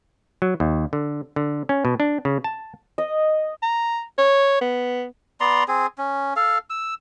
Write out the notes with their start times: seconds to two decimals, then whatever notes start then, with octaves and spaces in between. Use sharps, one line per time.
0.42 F#3
0.60 D#2
0.93 D3
1.36 D3
1.69 C#4
1.85 B2
2.00 D4
2.25 C#3
2.44 A5
2.98 D#5
3.63 A#5
4.18 C#5
4.61 B3
5.40 B3 D5 A#5 C6
5.68 C4 G#4
5.98 C#4
6.36 A4 F5
6.70 E6